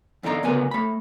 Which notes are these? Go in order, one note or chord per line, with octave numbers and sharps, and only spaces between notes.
E2 D3 D#4 D5 A#5
D2 C#3 B3 A#4 G#5
A3 B5